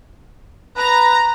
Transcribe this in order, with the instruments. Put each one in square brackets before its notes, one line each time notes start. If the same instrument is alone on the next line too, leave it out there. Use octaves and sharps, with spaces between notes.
[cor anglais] B4 [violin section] A#5